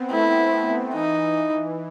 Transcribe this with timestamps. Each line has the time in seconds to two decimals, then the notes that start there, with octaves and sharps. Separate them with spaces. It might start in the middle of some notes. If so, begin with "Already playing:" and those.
Already playing: B3 C4
0.11 A3 E4
0.93 E3 D#4